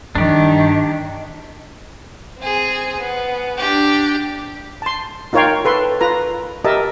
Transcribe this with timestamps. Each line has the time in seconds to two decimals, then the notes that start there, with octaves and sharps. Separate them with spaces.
0.15 G2 D#3 D4 G4
2.38 C4 G#4
3.00 B3
3.58 D4 G4
4.82 A5 C6
5.33 D#4 F4 A#4 C#5 F5 G5
5.65 A4 B4 C6
6.01 F4 B4 A#5
6.64 G4 A#4 D#5 E5 A5